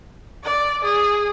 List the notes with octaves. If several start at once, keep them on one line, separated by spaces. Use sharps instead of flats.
D5
G#4